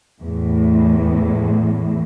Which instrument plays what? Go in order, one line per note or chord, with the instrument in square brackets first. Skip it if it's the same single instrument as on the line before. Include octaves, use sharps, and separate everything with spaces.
[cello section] E2 A2